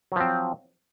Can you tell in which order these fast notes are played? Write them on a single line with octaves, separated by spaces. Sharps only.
F#3 F3 C4